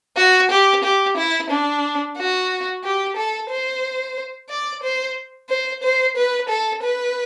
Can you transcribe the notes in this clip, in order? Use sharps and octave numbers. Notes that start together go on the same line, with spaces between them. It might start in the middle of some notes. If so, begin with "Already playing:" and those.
F#4
G4
G4
E4
D4
F#4
G4
A4
C5
D5
C5
C5
C5
B4
A4
B4